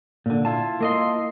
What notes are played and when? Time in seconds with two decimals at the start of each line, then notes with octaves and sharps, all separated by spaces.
0.26 A#2 D3
0.45 E4 F4 A5
0.81 A#3 D#5 C6